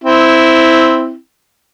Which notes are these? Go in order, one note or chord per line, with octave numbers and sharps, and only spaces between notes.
C4 E4